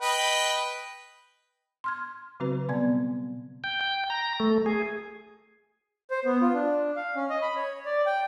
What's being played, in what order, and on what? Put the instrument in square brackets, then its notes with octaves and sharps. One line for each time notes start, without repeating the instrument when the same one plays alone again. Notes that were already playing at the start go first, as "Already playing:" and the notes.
[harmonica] B4 D#5 G5
[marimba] C6 F6 G#6
C#3 F#3 C4 F#4 B4
B2 G3 B3 D5 G#5 G#6
[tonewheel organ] G5
G5
A#5
A3
G#4
[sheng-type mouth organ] C5
B3
F4
D4
F5
C#4
D#5
B5
C#5
D5
G5